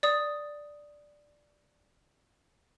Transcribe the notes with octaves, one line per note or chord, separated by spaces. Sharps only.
D5 D#6